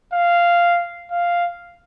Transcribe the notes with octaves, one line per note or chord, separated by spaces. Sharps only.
F5
F5